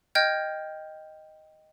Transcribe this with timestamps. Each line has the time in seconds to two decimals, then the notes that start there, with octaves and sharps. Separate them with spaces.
0.15 D#5 G5 F6 G6 G#6